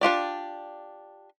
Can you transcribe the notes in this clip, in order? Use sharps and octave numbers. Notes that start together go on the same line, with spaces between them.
D4 F4 G4 D5